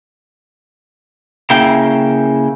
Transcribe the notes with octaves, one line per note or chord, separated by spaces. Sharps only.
C#3 A#3 E4 G5